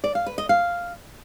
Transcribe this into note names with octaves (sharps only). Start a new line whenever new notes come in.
D5
F5
B4
D#5
F5